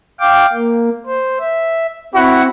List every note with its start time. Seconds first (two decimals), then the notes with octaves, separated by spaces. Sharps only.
0.20 F5 G5 D6
0.53 A#3
1.06 C5
1.40 E5
2.14 C4 E4 F#4